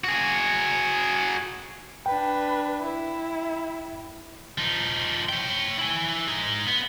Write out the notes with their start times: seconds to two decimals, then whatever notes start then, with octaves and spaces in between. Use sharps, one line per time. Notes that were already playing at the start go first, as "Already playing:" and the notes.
0.04 F#4 G#4
2.06 D4 B4 G5
2.82 E4
4.58 F3 D#4
5.29 C#5 G5
5.78 E4 G#5
6.28 D#4 G#4
6.67 B3